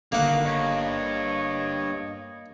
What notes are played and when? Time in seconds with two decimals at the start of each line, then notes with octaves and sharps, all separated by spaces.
0.12 G1 D#3 A#3 F#4 F5 F#5
0.45 G2 C#5 D#5 C#6